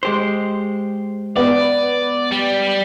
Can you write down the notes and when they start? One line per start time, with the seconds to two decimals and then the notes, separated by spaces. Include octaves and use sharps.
0.03 G#3 G4 C5
1.36 B3 D5
2.31 G3